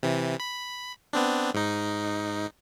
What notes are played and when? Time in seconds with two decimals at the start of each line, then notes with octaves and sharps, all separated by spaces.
0.03 C3 E3
0.40 B5
1.13 B3 C4 D4
1.54 G#2 D#4